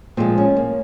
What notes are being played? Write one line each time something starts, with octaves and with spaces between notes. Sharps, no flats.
A#2 F3 G#3 C4
C#4
A#3